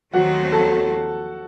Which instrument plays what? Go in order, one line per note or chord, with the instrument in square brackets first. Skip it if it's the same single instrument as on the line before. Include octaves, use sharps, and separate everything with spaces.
[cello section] D#2 D#3 F#3 A3 C4 [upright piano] F#4 F#5
[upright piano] A4 A5